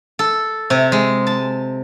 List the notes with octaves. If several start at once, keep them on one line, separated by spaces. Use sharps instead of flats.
A4
C3
G#3
A5